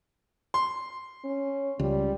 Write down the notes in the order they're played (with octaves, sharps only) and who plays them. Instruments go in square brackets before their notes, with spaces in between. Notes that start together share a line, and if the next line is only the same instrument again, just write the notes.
[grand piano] C6
[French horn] C#4
[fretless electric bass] C#2 [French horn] G3